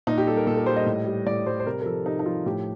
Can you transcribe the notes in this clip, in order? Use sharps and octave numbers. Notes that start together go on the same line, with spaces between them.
A#2 D#4
G4
G3 A4
A#4
A#2 A4
A#4
G3 C5
D#5
A2
G3
A2 D5
G3 C5
C5
C3 A#4
A#4
F3 A4
C3 D#4
D#4
F3 F4
A2 G4